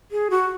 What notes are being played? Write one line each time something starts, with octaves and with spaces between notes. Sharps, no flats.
G#4
F#4